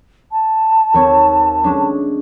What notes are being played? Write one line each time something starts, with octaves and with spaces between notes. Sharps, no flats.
A5
D#2 C4 C#5
G#3 C#4 D4